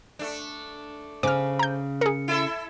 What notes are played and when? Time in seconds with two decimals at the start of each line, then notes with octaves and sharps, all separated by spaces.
0.19 A3 D4
1.23 C#3 C5 D6 F6
1.59 A#5 G6
2.01 G#4 A#4 C#7
2.28 E4 A4 E5